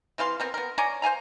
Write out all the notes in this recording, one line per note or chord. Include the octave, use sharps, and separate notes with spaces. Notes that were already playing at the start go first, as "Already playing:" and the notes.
C3 E3 F5 C6
B3 C4 A#4
B3 A#4
C#5 D5 G#5 A#5
C5 F5 G#5 A#5